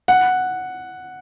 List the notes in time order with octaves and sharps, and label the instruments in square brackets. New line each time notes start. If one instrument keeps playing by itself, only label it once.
[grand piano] F#5